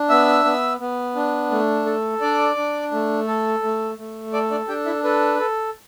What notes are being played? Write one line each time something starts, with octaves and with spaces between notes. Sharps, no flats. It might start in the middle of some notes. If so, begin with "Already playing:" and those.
Already playing: D4
B3 E5 E6
B3
B3
D4
A3
A4
D4 D5 D6
D4
A3
A4
A3
A3
A4 D5 D6
D4 D5
D4 G4 G5
E4 E5
A4 B4
A4